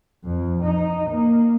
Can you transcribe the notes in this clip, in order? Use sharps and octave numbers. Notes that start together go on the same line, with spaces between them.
F2
D#4
A#3